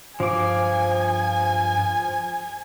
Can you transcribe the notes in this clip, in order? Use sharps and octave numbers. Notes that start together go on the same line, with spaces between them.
G2 F3 G#5 D6